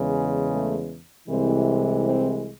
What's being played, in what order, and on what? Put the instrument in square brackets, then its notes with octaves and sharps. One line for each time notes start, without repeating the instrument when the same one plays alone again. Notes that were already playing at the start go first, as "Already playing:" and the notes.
Already playing: [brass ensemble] E2 C#3 G#3
G#4
A3
C2 C3 E3 G#3 C4
C4